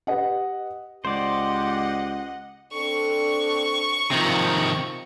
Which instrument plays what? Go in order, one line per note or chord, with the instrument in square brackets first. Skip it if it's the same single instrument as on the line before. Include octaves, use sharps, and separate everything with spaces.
[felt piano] G4 B4 D#5 F#5
[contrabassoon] C#2 [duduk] G4 [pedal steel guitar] C5 D5 [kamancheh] D#5 F#5
[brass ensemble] C4 D4 A4 [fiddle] C#6
[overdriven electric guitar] C3 D#3 [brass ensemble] F3